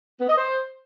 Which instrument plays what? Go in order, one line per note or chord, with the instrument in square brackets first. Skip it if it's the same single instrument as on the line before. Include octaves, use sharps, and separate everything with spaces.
[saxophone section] B3
D#5
C5